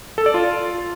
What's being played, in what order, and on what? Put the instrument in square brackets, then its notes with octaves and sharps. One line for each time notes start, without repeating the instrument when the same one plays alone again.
[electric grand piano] A4
D5
F4